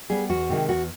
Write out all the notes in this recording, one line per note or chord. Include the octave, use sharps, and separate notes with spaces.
G3 B3 G#4
E2 F#4
C3 D#3 G#3
E2 F#4